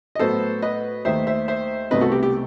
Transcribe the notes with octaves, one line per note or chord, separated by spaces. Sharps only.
D#5
A2 F#3 B3 A4 C5
B4 D#5
D#2 D#3 A3 C5 E5
C5 E5
C5 E5
C2 B2 A3 C4 B4 D#5
F#4 A4
G4
G4